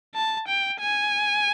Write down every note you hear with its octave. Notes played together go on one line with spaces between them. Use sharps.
A5
G5
G#5